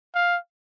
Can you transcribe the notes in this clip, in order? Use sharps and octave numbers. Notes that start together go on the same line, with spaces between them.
F5